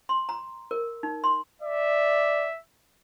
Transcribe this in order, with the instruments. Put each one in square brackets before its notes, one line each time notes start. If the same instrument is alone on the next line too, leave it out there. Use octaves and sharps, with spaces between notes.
[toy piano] C6
A#5
A#4
D#4
C6
[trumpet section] D5 [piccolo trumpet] E5